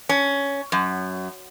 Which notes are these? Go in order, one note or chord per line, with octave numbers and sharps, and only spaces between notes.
C#4
F#2